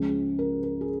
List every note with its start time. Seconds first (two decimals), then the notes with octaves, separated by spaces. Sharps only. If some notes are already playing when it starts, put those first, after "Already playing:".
Already playing: C#2 C#3 F3 G#3 C#4
0.39 A#4
0.64 A#4
0.81 G#4